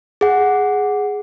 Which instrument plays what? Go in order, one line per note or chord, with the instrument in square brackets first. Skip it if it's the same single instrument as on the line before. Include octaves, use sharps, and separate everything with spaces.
[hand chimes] G#4 F#5